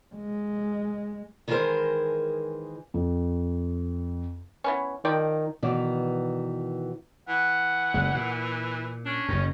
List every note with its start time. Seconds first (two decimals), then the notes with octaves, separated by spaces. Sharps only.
0.15 G#3
1.48 D#3 E3 G#3 G#4 A#4 C5
2.94 F2
4.64 E3 B3 C#4
5.05 D#3 F3 D5 G5
5.63 B2 D#3 E3 B3 E4 D5
7.29 E3 F#5
7.94 F#1 G#3
8.15 A#2
9.06 C#4 D4
9.29 F#1 F#2 D#3